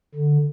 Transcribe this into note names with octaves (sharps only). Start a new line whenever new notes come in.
D3